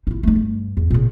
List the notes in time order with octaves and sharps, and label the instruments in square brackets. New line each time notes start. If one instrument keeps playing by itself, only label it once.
[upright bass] D#4 E4
A3 D#4
G2
E2
A#2 C#3